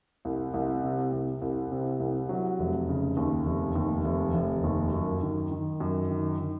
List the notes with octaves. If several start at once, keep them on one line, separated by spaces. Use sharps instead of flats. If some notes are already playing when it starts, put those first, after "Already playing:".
C2
C2
C3
C2
C2
C3
C2
F#3
F1
C#3
D#2
F1
D#2
F1
F1
D#2
F#2
D#3
D#3
F#2
D#3
D#3